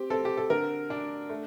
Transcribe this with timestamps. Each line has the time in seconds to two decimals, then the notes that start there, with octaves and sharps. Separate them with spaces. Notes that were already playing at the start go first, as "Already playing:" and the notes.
Already playing: C4 G4
0.10 C4 A4
0.25 G4
0.37 A4
0.50 D3 A#4
0.90 D4
1.30 A3